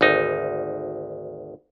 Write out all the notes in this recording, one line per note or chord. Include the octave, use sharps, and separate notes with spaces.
G#1 D2 D#4